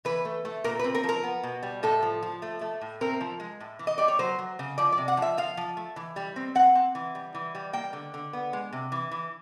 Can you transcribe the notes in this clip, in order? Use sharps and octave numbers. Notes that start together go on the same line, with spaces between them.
E3 B4
A3
A3
A#2 A#4
B4
C4
A#4
F3
A#4
B3
B2
G3
A2 A4
F3
F3
A3
A3
A2
C4 A#4
F3
G#3
A2
E3
D#5
G3 D5
C#5
F#3 C5
F#3
C#3
F3 D5
D5
C3
F#5
F3 E5
F3 F5
F3
A3
E3
G3
C4
C4 F#5
C4
E3
G3
E3
G3
A#3 G5
D3
D3
B3
G#3
C3
E3
E3